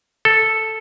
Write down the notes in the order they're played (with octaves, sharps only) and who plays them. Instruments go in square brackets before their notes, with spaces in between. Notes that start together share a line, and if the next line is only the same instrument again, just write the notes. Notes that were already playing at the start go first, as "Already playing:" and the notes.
[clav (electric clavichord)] A4